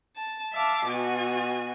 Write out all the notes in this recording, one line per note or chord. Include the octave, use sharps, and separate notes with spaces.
A5
E5 F5 A5 D6
B2 F#4 G#5